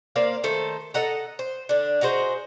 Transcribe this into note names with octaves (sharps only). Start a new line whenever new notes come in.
A#3 C5 D5 F5
D#3 A3 A4 C5
A4 D#5 F#5 A#5
C5
D3 D4
D#4 F#4 G#4 C5